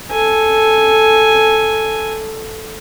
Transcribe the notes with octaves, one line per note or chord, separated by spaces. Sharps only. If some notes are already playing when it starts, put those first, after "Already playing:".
A4 G#5